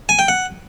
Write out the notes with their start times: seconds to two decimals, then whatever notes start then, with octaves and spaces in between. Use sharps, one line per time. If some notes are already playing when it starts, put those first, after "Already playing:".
0.09 G#5
0.19 G5
0.28 F#5